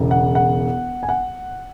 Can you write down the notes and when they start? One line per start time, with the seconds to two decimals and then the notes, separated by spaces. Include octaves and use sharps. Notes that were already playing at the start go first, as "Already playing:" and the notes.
Already playing: E1 E2 C#3
0.11 F#5
0.35 F#5
1.03 G#5
1.09 F#5